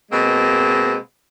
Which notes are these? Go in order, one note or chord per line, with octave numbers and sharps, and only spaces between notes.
B2 G#3 A#3 C4